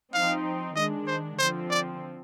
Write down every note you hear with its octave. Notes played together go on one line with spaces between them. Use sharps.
F3 C4 D#4 F5
D#3 G#3 D4 D#5
C5
D3 F3 C4 C5
D5